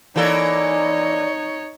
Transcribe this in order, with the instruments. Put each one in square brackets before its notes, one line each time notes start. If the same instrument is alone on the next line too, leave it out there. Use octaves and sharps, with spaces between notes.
[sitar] E3 A#3 A4 [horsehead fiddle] D#4 C#5 [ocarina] D5